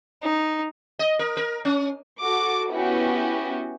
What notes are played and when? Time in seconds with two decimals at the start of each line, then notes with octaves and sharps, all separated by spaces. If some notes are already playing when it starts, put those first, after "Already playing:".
0.23 D#4
0.99 D#5
1.19 A#4
1.37 A#4
1.65 C#4
2.20 F#4 A4 D6
2.72 B3 C#4 E4 F#4 G4